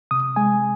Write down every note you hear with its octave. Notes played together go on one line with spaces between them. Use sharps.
C3 D#6
G#3 G#5